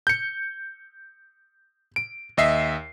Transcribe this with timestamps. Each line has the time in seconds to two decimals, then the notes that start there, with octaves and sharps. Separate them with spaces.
0.07 G6 C#7
1.96 D7
2.37 D#2 D#5 E5 C7